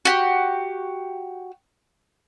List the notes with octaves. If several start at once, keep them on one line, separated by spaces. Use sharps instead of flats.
F#4 G4